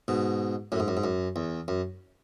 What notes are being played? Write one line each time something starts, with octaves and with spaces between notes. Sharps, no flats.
G#2 B2
F#2 A2
G#2
F#2
G#2
F#2
E2
F#2